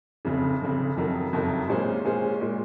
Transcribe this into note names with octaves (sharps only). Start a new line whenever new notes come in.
F1 F2 C#3
F1 F2 C#3
F#1 F2 D#3 F#3
F#1 F2 D#3 F#3
A#2 G#3 C#4 G#4 C5
A#2 G#3 C#4 G#4 C5
A#2 G#3